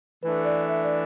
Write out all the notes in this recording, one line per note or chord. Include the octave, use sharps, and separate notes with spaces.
E3 A3 D4 B4
D5
E5
D5